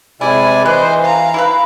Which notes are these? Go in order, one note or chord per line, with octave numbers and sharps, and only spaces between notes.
C3 G#3 E4 D5 G#5
E3 G#3 B4 C5 D#5 F#5
F5 A#5
E4 G4 B4